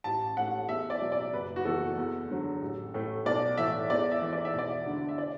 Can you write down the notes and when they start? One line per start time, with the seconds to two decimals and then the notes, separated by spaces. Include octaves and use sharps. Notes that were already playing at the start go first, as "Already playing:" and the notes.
0.04 A1 A5
0.37 A2 A3 F#5
0.69 E2 E5
0.90 D5
1.01 B2 F#3
1.12 D5
1.33 F#1 B4
1.56 F#4
1.65 E2 E3 A3 A4
1.97 E2
2.30 D3 F#3
2.62 A1
2.94 A2 A3
3.25 B1 D5
3.57 A2 E3 A3 E5
3.90 E2 D5
4.11 E5
4.22 E3 A3
4.33 D5
4.45 E5
4.54 E1 D5
4.86 D2 D3
5.09 E5
5.18 D5